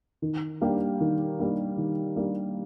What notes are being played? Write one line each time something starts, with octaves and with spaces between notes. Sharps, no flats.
D#3
G3 A#3 D4 G4
D#3
G3 A#3 D4 G4
D#3
G3 A#3 D4 G4